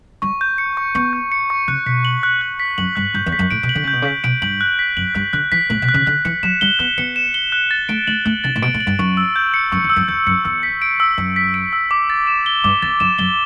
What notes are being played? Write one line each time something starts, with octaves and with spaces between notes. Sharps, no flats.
G3 C#6
G6
C#7
C#6
B3 C#6
G6
C#7
C#6
C#3 F#6
B2 B6
F#7
F#6
F#6
B6
F#2 F#7
G2 F#6
G2 G6
E2
B6
F#2
A2 D7
B2
F#7
D3
C#3 G6
B2
C#3
B6
B2 D7
G2 F#7
F#6
B6
F#2 F#7
G2 F#6
D3 F#6
E3 B6
A2 F#7
B2
F#6
C#3
D3 F#6
E3 C#7
F#3 E7
G3 G7
B3 F#6
B3 C#7
E7
G7
F#6
A6
A3 D7
A3 F#7
A3 F#6
C#3 A6
A2
B2 D7
A2
F#7
G2
F#2 C#6
E6
G6
C#7
F#2 C#6
E2
E6
F#2
E2 G6
F#2 C#7
E2 E6
B6
D7
E6
F#2 E6
B6
D7
E6
D6
A6
E7
G7
G2 D6
E2 A6
F#2 E7
F#2 G7